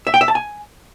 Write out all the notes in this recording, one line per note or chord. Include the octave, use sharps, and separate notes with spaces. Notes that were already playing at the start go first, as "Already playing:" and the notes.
E5
G5
E5
A5
G#5